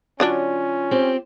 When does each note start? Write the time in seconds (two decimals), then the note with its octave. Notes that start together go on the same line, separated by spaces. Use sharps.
0.20 D3 F#3 C#4 D4 F4
0.91 C4 G4